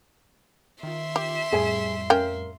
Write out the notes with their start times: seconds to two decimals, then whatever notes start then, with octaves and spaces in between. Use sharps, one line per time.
0.83 D#3 F4 E5 C6
1.16 G4
1.52 F2 A2 G3 G#4 G#5
2.10 C#4 A#4 F5 G5